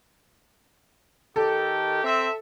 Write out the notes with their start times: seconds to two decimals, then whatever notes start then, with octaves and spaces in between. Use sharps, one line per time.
1.36 D#3 G4 A4
2.04 C4 E5